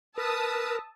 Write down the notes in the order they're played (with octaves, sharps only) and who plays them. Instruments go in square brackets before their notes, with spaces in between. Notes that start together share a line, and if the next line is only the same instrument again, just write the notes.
[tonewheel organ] A#4 [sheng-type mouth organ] B4 [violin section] A5 D#6 E6